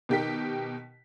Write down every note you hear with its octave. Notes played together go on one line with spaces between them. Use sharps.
B2 D#3 G4 A#4 G5 B6